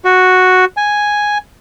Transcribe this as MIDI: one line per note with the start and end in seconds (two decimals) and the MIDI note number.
0.05 0.65 66
0.77 1.38 80